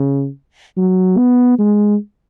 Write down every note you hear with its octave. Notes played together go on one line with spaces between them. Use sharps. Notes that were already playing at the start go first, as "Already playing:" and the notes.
Already playing: C#3
F#3
B3
G#3